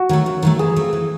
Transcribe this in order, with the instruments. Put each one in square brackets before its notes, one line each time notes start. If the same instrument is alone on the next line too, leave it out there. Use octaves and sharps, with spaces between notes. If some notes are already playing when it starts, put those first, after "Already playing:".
Already playing: [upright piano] F#4
[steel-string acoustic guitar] D#3 F#3 A3
F#2
D#3 F#3 A3
[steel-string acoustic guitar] E3 [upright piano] G#4
[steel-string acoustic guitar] A3 C4 F4
E3